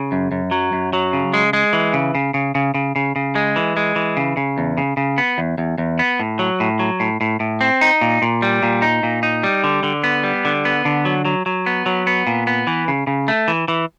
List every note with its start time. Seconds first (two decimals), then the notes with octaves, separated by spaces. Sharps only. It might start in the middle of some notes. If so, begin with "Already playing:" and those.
Already playing: C#3
0.12 F#2
0.32 F#2
0.51 F#3
0.73 F#2
0.93 F#3
1.13 C#3
1.34 G#3
1.53 G#3
1.73 E3
1.93 C#3
2.15 C#3
2.34 C#3
2.55 C#3
2.74 C#3
2.96 C#3
3.16 C#3
3.35 G#3
3.56 E3
3.77 G#3
3.96 E3
4.17 C#3
4.37 C#3
4.58 E2
4.78 C#3
4.97 C#3
5.18 B3
5.38 E2
5.58 E2
5.78 E2
5.99 B3
6.20 A2
6.39 F#3
6.60 A2
6.79 F#3
7.00 A2
7.21 A2
7.40 A2
7.61 C4
7.81 D#4
8.01 A#2
8.22 A#2
8.42 G3
8.63 A#2
8.82 D#4
9.03 A#2
9.23 D#4
9.43 G3
9.64 D3
9.83 D3
10.04 B3
10.24 G3
10.45 D3
10.65 B3
10.85 D3
11.05 F#3
11.25 F#3
11.46 F#3
11.66 B3
11.86 F#3
12.07 B3
12.27 A#2
12.47 B3
12.67 E3
12.88 C#3
13.07 C#3
13.28 A3
13.48 E3
13.68 E3